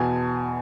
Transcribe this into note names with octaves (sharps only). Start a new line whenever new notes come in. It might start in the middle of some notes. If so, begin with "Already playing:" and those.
Already playing: E2 B2 G#5 A5